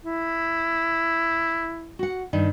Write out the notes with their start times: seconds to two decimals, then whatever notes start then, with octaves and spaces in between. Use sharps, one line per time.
0.05 E4
1.99 F#4 F#5
2.33 G2 D#3